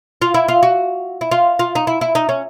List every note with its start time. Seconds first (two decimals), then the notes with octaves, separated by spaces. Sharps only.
0.22 F4
0.34 E4
0.49 F4
0.63 F#4
1.21 E4
1.31 F4
1.59 F4
1.75 D#4
1.87 E4
2.01 E4
2.15 D#4
2.29 C#4